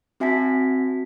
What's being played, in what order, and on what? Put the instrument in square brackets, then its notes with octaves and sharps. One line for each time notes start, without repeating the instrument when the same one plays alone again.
[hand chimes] C4 F#4 E5 G#5 A5 B6